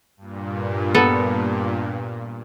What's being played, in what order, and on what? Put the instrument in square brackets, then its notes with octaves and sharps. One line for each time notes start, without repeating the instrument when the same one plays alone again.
[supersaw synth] G2 A#2
[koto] B3 A4